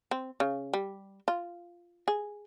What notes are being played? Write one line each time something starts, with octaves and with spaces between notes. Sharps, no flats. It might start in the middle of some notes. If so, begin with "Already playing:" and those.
C4
C#3
G3
F4
G#4